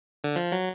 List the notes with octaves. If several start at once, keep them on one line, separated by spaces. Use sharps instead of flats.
D3
F3
F#3